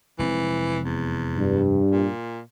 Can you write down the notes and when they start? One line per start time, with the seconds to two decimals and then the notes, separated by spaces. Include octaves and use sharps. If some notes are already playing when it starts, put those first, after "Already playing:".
0.19 F1 E3 G#3 C4
0.85 E2
1.37 G2
1.91 A#2